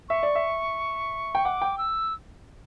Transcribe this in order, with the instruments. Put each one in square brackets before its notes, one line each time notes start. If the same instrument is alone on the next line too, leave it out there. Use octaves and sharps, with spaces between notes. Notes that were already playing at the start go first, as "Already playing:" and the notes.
[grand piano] E5 [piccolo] C#6
[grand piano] D5
E5
G5
[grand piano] F#5 [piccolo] D6
[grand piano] G5
[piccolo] E6